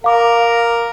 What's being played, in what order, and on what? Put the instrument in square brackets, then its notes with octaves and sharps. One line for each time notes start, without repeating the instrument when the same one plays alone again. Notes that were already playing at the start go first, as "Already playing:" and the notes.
[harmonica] A#4 [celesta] F5 D6